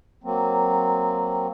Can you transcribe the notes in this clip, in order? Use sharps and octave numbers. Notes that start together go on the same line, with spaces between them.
F#3 A#3 C4